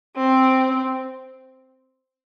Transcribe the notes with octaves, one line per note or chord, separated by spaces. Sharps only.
C4